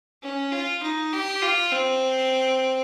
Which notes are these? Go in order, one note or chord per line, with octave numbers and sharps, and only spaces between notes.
C#4
F4
D#4
G4
F4
C4